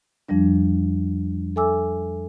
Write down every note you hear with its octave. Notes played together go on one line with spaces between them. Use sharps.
F2 F3 G3 D4
A4 E5 G#5 D6 E6